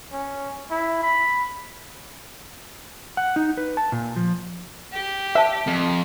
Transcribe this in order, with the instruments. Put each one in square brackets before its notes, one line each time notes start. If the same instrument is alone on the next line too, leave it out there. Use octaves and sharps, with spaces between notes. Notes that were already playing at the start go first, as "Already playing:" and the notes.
[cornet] C#4
E4
B5
[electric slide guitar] F#5
D#4
B4
A5
A#2
F3
[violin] G4
[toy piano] C5 A5 [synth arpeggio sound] E5
[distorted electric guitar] F2